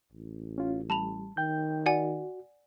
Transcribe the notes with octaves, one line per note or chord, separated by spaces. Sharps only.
A1
C#4 F4
G3 A5 B5 F7
D#3 G5 G6
F#4 D5 F#5 G#5